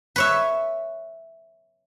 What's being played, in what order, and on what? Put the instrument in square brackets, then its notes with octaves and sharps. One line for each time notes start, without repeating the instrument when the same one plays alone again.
[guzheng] B4 C#5 E5